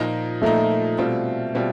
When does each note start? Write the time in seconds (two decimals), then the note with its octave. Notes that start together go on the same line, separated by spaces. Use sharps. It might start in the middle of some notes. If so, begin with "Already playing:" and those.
Already playing: A#2 F3 A#3 D#4
0.42 A#2 F3 A3 A#3 D#4
0.98 B2 G3 C4 F4
1.55 B2 G3 C4 F4